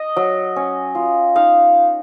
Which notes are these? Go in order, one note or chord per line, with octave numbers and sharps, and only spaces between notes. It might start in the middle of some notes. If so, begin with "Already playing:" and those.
Already playing: D#5
F#3
C#4
F4
D#4 F5